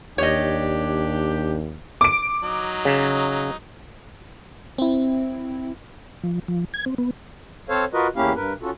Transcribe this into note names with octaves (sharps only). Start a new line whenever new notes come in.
D#2 D4 G4 C#5 D#5
D6 D7
F#3 D#4
C#3
C4 E4
F3
F3
G#6
C4
B3
C4 A4 C5 C#5 F5
F4 F#4 A#4 B4 D#5
E2 A#3 C#4 E4 G4 F5
G2 A#4 B4
C#4 F4 F#4 A4